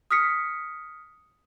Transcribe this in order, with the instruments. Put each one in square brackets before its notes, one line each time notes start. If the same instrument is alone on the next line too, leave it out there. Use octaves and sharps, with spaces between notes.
[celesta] D#6 F6 B6 C#7